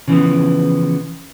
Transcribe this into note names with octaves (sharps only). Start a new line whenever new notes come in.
C#3 E3 F3 B3